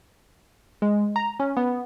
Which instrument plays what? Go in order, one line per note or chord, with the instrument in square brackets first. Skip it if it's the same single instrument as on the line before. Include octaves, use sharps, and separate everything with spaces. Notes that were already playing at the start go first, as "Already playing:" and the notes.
[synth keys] G#3
A#5
C#4
B3